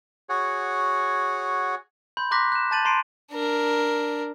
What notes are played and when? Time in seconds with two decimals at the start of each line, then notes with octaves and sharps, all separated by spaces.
0.29 F#4 G#4 C#5 F#5
2.17 B5 C6 G6
2.31 A#5 C6 D6 F#6 A#6 B6
2.52 F#6 E7
2.71 A5 G6 A6 D#7 F#7
2.85 A#5 C6 C7 D7 D#7
3.32 D4 A#4